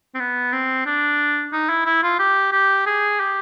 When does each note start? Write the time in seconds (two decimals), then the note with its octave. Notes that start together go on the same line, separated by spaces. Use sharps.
0.14 C4
0.20 B3
0.52 C4
0.86 D4
1.53 D#4
1.69 E4
1.86 E4
2.03 F4
2.19 G4
2.52 G4
2.86 G#4
3.20 G4